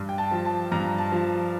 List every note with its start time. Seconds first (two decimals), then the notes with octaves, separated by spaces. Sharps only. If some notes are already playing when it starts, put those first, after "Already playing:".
Already playing: G2
0.09 G5
0.18 A5
0.31 F3
0.45 A5
0.72 G2 A#5
0.98 A5
1.12 F3